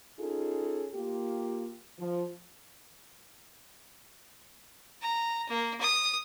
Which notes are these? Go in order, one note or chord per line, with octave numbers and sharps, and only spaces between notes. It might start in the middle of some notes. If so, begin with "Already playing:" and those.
C#4 D#4 F4 G#4 A4
A#3 F4 G4
F3
A#5
A#3
D#6